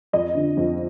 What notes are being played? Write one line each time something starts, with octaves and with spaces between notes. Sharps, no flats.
F2 D#5
D3
F2